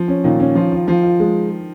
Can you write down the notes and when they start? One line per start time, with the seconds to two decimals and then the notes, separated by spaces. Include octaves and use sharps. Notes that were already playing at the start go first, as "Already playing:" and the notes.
Already playing: F3
0.08 C#4
0.24 A#2 D#3
0.40 C#4
0.55 F3 F4
0.72 F4
0.87 F3 F4
1.03 F4
1.20 G#3